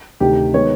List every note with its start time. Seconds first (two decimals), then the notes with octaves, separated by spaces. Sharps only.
0.20 D2 C3 D#3 G4
0.54 D#3 G#3 B3 C#5